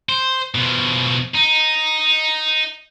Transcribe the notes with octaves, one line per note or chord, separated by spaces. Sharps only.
C5
B2 F3
D#4